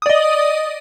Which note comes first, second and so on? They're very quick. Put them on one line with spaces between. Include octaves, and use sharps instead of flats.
D#6 D5 D#5